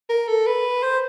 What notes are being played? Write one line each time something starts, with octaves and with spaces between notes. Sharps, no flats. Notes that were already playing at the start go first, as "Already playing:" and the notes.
A#4
A4
B4
C5